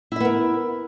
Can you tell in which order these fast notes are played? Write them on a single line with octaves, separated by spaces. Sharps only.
E4 E5 B3 A#4